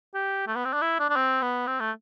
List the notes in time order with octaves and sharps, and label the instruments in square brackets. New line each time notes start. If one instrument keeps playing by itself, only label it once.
[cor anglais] G4
A3
B3
C4
D4
E4
D4
D4
C4
B3
C4
A3